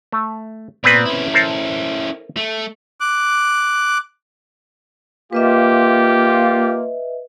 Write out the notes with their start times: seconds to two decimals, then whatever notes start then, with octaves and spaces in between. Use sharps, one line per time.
0.12 A3
0.84 A#2 B3 C4 B4
1.05 C#4 E4
1.34 A4 A#4 C5
2.37 A3
3.00 D6 F#6
5.33 A#3 F4 G4 B4 D#5 E5